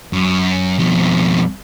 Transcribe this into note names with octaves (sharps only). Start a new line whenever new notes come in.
F#2
F2 B2